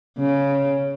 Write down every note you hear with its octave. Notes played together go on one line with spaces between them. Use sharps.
C#3